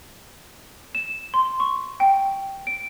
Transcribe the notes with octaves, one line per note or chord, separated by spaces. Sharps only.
E7
C6
C#6
G5
D7